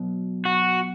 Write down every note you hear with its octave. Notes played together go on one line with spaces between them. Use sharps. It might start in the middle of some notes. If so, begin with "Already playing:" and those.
Already playing: B2 F#3
F#4